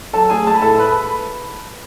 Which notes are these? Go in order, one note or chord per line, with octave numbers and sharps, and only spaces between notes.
F#3 A4 A5
A3 G#4 G#5
G#3 A5
B5
A2 A4 A5
B4 B5